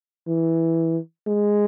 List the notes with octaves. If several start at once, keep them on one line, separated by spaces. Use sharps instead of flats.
E3
G#3